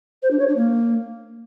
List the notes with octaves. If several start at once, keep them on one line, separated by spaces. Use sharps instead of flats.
C5
D4
C#5
D4
A#3